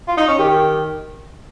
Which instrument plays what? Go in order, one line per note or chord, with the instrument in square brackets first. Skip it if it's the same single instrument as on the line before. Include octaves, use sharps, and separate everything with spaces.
[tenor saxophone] F4
D#4
C#4
[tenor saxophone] D#3 [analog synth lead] G4